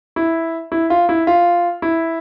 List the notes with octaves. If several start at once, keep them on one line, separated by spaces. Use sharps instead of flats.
E4
E4
F4
E4
F4
E4